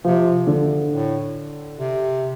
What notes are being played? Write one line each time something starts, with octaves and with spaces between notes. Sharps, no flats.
C3 F3
D3
A2
C3